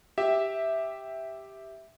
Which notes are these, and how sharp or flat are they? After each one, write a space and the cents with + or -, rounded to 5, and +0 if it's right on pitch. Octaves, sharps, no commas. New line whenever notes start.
G4 +0 E5 -5